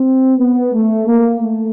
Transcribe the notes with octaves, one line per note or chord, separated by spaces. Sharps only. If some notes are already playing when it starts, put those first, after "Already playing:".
Already playing: C4
B3
A3
A#3
A3